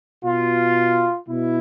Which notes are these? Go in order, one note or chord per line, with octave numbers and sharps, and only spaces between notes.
B2 F4
B2 E4